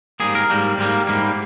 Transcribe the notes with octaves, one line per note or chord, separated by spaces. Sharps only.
G#2 G3 A#3 G#4
A#4
G#2 G3 A#3
G#2 G3 A#3
G#2 G3 A#3